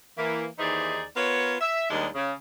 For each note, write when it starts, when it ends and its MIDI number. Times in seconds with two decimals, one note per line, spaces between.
0.17 0.45 52
0.17 0.45 58
0.59 1.03 39
0.59 1.03 52
0.59 1.03 63
0.59 1.03 68
0.59 1.03 72
0.59 1.03 74
1.16 1.54 59
1.16 1.54 65
1.16 1.54 70
1.16 1.54 73
1.61 1.88 76
1.90 2.06 39
1.90 2.06 51
1.90 2.06 55
1.90 2.06 56
1.90 2.06 62
2.15 2.32 49